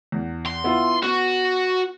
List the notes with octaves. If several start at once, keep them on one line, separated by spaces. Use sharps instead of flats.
E2
C6
B3 E4 F4
B3 F#4